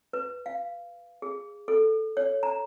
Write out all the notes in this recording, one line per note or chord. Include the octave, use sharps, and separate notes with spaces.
B4
F5
G#4
A4
C#5
A#5